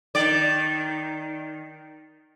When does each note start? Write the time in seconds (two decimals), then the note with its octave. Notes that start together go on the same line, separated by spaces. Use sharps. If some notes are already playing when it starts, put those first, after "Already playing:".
0.15 D#3 D5